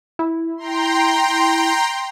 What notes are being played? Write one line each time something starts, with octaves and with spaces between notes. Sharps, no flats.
E4
G5 A#5 C6